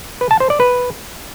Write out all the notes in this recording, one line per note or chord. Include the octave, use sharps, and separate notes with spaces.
B4
A5
C5
D5
B4